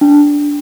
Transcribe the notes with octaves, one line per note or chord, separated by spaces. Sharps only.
D4